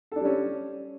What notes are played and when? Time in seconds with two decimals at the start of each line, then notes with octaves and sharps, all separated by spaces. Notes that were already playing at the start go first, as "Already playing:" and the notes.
0.12 A4
0.16 D4
0.21 G3
0.25 C#4